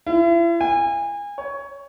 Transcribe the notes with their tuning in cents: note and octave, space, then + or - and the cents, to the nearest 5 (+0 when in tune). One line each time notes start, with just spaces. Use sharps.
E4 +40
G#5 -30
C#5 +15